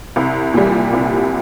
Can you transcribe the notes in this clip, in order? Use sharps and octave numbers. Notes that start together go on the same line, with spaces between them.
C2
A#2 G3
C2